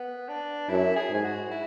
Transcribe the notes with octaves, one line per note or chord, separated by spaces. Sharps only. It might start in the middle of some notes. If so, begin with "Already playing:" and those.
Already playing: B3
D4
F#2 E4
G#4
G#2 G#4
F#4
E4